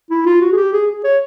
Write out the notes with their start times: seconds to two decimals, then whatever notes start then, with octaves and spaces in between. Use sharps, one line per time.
0.11 E4
0.26 F4
0.41 F#4
0.52 G#4
0.57 G4
0.73 G#4
0.88 G#4
1.04 C#5